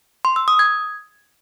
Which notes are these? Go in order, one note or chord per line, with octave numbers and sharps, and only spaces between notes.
C6
E6
D#6
G#6